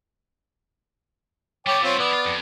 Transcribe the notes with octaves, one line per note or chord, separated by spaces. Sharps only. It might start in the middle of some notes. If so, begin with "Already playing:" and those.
G3 B3 C#5 G5 D6
C4 F4 C#5
E3 B3 E4 D5
F4
F2